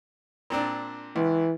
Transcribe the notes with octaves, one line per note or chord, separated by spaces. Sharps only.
A#2 C4 D4
C#2 E3